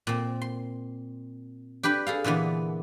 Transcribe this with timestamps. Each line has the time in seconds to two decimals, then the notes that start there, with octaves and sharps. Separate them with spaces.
0.07 A#2 C4
0.42 C6
1.83 D4 G4 B4 B5
2.07 G#4 A4 F5
2.24 A#2 D3 E3 B3